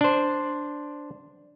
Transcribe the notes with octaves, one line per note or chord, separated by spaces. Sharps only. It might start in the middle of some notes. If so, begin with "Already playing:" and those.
D4 C5